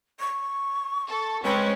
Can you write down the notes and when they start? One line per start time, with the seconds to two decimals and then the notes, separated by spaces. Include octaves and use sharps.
0.19 C#6
1.07 A4
1.44 G#3 C4 C#4 B4